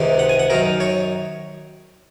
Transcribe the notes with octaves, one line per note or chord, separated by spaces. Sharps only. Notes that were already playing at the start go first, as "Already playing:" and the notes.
Already playing: C#2 C3 D#3
F#5
G#5
F#5
F#2 D#3 A#4
C#5